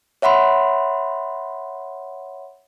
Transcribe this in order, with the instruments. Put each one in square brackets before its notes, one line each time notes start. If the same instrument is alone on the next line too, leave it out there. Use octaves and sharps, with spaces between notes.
[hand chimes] C#5 E5 F#5 B5 C6